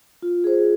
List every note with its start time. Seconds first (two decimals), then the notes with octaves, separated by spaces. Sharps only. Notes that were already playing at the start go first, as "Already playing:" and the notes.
0.22 F4
0.44 G#4 C5